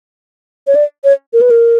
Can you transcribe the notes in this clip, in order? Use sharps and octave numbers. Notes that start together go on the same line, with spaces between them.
C#5
D5
C#5
A#4
B4
A#4